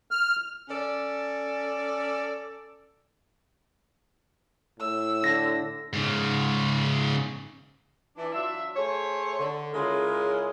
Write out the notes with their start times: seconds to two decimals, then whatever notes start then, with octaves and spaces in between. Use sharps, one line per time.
0.11 F6
0.69 C#4 A4 D5
4.80 A2 E6
5.24 D3 A#6
5.93 G#2 C#3
8.16 E3 D4 E4
8.32 F#3 D4 F4 E5
8.75 A3 G#4 C5 C#5
9.39 D3
9.73 C#3 G#3 C#4 E4 F4 A#4